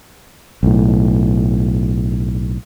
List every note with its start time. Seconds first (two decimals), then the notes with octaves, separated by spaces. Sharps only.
0.63 B1 A2